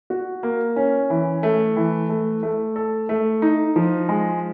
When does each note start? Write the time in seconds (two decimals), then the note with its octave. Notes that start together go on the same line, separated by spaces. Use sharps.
0.10 F#4
0.43 A#3
0.76 C#4
1.10 E3
1.43 A3
1.76 E3
2.09 A3
2.43 A3
2.76 A4
3.09 A3
3.42 D#4
3.76 F3
4.09 G#3